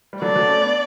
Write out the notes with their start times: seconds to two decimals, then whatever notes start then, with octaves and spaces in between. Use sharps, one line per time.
0.13 G3
0.22 D3 F#3 D5
0.35 D3 F#3
0.48 A3 C#4
0.61 B3 D4